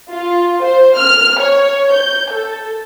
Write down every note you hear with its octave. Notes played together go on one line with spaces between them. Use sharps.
F4
C5
F6
C#5
G6
A4